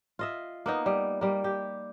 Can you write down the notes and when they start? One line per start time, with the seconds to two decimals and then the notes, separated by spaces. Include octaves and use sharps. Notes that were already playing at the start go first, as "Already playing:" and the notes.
0.19 F4 D#5 E5
0.66 A#3 B3 D#4
0.86 G3
1.21 G3 A#3
1.44 G4